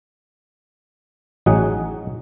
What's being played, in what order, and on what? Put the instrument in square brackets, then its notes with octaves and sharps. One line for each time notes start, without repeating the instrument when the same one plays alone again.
[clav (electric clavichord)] A1 F#3 D#4 G#4 F#5